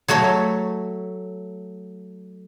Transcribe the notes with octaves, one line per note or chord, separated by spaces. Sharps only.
F#3 A3 A4 C#5